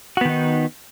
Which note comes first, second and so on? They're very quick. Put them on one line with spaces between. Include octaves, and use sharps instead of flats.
F#4 B3 D#3 D#4